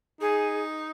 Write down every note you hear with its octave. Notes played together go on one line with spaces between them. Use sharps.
D#4 G#4